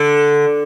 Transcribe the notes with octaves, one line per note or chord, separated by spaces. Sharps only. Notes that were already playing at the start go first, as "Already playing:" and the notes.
Already playing: D3